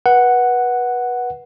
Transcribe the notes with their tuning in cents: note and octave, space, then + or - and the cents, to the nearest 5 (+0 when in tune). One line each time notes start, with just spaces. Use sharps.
B4 -25 F#5 +0